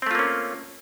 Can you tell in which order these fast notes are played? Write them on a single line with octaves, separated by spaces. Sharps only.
C4 A3 F4 A#3 C#4